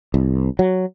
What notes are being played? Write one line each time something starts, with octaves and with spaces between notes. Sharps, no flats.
C2
F#3